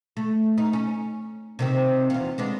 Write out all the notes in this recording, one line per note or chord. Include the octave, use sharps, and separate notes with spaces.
A3
D#4
C#4
C3 D#3 C4
E2 F4
G#3 B3 D4